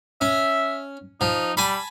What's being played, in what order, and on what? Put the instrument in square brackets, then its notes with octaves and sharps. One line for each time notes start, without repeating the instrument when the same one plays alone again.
[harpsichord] C#4 [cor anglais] E5
[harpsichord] F3 [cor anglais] D#4
[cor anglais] G3 [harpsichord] G#5 A5 B5